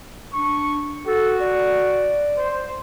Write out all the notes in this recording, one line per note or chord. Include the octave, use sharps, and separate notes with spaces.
D4 C#6
F#4 A4
D5
C5